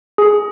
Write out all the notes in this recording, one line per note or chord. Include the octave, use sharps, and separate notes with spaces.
G#4